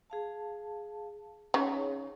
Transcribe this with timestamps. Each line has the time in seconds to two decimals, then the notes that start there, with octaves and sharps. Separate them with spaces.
0.10 G#4 F5 A5
1.54 C#3 D#4 G#4 C#5